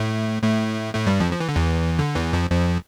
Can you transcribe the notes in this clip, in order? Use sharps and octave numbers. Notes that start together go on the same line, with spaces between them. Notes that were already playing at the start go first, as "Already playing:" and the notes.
Already playing: A2 A3
A2 A3
A2 A3
G2 G3
F2 F3
F3
E3
D3
E2 E3
D3
E2 E3
F2 F3
F2 F3